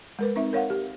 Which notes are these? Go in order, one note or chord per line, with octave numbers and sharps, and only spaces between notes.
G#3 A#4 B4
C4 D#4 E5
A#4 C#5 F5 F#5
G4